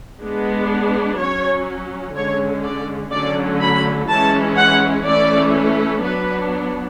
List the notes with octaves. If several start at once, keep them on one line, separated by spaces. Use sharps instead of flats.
G#3 B3 D4
F#3 C#4 C#5
D3 G#3 C#4 C#5
D5
D3 F#3 A3 C#4 D5
B5
E3 G#3 C#4 A5
F#5
E3 A3 C#4 D5
F#3 B3 D4 B4